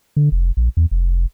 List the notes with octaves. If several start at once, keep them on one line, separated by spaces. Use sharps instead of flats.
D3
F1
A#1
E2
F1